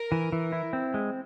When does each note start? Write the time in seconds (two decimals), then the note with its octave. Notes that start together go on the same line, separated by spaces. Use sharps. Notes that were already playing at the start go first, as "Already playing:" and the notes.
Already playing: A#4
0.12 E3
0.32 E3
0.52 E4
0.73 C4
0.94 G#3